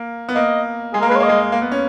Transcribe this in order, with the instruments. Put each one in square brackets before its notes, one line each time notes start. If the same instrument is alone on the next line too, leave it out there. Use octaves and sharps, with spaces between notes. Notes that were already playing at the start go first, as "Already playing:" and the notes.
Already playing: [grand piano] A#3
B3
[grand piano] A#3 [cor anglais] D#5
[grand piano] G#3 [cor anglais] G#4
[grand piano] A#3 [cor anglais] A#4
[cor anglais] B4
[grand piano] G#3
[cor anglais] C#5
[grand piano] A#3 [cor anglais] D#5
[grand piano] G#3
A#3
B3
C#4